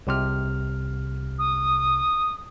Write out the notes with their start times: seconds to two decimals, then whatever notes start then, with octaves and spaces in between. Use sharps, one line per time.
0.07 C2 C3 F6
1.38 D#6